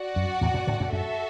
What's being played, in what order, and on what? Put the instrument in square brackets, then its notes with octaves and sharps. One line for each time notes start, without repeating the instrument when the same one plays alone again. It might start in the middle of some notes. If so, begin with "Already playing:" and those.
Already playing: [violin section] F#4 D5 F#5
[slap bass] F#2
E2 A2
F#2 B2
A2 D3
F#2 B2
[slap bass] F#2 [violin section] F#4 A4 E5